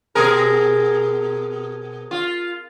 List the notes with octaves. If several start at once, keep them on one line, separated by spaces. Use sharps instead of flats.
B2 G#4 A#4
F4